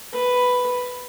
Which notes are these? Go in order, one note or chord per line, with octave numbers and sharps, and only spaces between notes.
B4